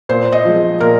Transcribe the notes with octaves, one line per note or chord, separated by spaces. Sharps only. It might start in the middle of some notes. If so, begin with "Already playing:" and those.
A#2 C5
D#5
F3 G#3
A#2 A#4